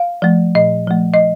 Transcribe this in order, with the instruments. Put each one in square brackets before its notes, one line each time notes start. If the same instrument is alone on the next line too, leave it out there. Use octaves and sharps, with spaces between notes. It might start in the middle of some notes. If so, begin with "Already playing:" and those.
Already playing: [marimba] F5
F3 A3
A#2 D#5
F3 A3
D#5